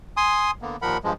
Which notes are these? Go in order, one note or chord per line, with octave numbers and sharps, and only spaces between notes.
G#5 C6 D#6
D3 A#3 B3
D#2 A#2 F3 A#4 F#5 B5
G2 F3 G#3